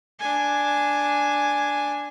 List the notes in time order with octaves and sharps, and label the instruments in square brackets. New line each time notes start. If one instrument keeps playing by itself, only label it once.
[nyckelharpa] D4 G#5